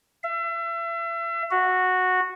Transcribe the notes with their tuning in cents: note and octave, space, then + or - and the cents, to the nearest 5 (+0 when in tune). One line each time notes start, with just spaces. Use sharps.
E5 +35
F#4 -10